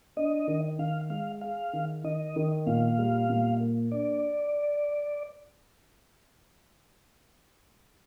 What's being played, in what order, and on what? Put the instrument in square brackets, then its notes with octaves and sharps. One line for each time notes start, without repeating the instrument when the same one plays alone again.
[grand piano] D4 [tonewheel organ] D#5
[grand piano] D#3
[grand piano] D#3 [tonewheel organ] F5
[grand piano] G#3 [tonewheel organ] F5
[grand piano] G#4 [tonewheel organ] F5
[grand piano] D#3
[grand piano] D#3 [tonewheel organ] D#5
[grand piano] D#3
[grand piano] A#2 [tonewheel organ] F5
[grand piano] G3
A#2
A#3
[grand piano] D4 [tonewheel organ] D5